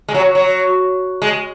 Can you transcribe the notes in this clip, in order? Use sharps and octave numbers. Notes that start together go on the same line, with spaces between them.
G#3
F#3
F#3
G#3